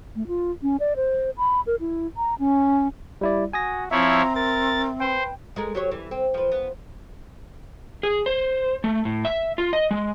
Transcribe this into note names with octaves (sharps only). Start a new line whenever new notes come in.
A3
F4
C#4
D5
C5
B5
A#4
E4
A#5
C#4
G3 E4 D5
F#4 G#5 D#6 A#6
F3 C4 E4 C#5 E5 A#5
A#4 A6
B4 C5 G5
G#3 A4 A#4
F#3 G4 C#5
E3 G3
C4
F3 B4
B3
G#4
C5
A3
A2
E5
F4
D#5
G#3